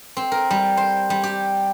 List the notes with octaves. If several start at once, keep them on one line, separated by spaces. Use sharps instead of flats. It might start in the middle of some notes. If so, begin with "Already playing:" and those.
C4
A#4
G3
C5
G3
G4